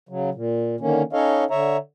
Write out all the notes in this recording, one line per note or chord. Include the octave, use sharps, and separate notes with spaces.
C#3 F#3
A#2
D3 D#3 A#3 C#4
C#4 D#4 A4 C#5 D#5 F5
D3 C#5 E5 A#5